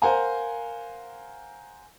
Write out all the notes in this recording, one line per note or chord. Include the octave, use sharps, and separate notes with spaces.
A#4 C5 F5 F#5 G#5 A#5